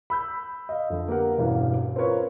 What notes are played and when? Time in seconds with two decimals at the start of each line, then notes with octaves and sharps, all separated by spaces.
0.10 B5 E6 G6
0.69 D#5 F5
0.90 F2 D3
1.08 A#3 B3 G4 A#4 F#5
1.38 E1 G2 E3 C#4 F5
1.96 C4 C#4 F4 A#4 B4 C#5